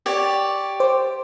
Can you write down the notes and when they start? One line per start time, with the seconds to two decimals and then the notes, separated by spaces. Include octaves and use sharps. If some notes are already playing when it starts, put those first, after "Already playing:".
0.06 G4 C#5 D5
0.80 C5 D6